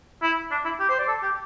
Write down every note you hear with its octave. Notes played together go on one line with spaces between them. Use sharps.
E4
D4
E4
G4
C5
D5
A4
G4